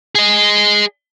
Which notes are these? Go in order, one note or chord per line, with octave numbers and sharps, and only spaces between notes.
G#4 D#5